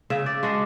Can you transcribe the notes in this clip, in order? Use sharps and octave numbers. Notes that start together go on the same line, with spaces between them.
C#3 E5
D5
G#3 D4 F#4